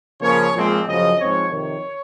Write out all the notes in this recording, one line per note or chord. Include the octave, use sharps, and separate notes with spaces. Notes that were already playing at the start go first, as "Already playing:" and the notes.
C#3 F3 A#3 C#5
A#2 F3 G#3 C4
F#2 C#3 F3 D#5
G#2 F3 C4 C#5
F2 C3 D#3 C#5